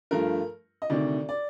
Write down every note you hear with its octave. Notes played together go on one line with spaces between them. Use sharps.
G2 F3 A3 A#4
D#5
D2 C3 D#3 D5
D5